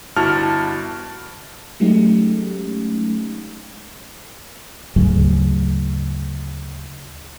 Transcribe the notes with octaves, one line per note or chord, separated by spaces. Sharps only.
G1 E4 F#4 A5 F6
F#3 G#3 A3 C#4 D#4 G4
D2 G#2 C#3 F#3